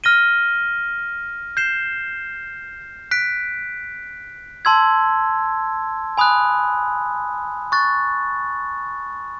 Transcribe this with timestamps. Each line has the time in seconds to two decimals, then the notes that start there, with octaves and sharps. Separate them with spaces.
0.04 F6 A#6 D#7 G7
1.57 G6 C7 E7 G7
3.11 F#6 B6 D7
4.65 A5 C6 E6 G#6
6.18 G#5 B5 D#6 F#6
7.72 C#6 F#6 A6